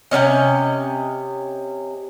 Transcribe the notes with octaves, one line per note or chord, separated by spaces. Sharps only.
C3 E3 C#4 D#5